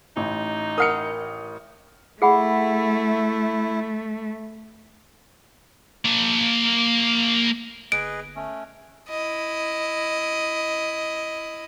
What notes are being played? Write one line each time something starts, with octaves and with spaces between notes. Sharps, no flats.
A1 D#4
A#4 F#5 D#6 F6 C#7
A3 E4 G#4 F#5 B5
A#3 A5
G1 G#4 B4 D#5 D7
A3 C#4
E4 D#5